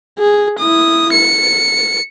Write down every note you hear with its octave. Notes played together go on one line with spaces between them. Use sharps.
G#4
E4 D#6
C#7